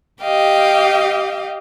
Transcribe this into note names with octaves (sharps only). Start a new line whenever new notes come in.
G4 D#5 F5 G5